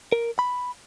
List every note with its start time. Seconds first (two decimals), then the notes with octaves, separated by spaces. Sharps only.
0.12 A#4
0.39 B5